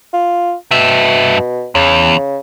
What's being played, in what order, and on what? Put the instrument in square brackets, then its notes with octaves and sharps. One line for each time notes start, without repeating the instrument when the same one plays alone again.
[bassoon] F4
[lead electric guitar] G2 E5 [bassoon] B2
[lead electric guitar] E2 [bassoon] C#3